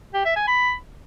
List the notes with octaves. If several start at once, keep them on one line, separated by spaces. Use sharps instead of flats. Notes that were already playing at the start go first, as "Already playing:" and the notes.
G4
E5
G#5
B5